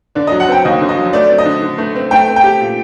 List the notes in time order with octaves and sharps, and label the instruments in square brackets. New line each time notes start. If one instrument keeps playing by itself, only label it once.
[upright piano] D3 [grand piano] D5
[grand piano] D#5
[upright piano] F#3
[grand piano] F#5
[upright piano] C4 [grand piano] G5
[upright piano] D#2 [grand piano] D#5
[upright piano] D3
[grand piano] D#5
[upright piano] F#3
[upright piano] A3 [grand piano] D5
[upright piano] C4
[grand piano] D#5
[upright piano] D3
D3
A3
C4
[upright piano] A3 [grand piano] G5
[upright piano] C4
[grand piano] G5
[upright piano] G4
A#2